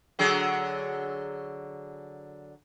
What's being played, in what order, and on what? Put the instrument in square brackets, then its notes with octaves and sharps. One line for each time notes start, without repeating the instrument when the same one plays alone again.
[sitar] D3 F#3 G#4